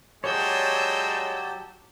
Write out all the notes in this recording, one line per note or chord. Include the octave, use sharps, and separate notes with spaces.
F#3 G#3 G4 C#5 D5 A5 E6 G6